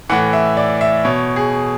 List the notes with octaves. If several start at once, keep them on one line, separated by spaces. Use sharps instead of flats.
A2 E3 F#5
E5
D5
E5
B2 C#5
G#4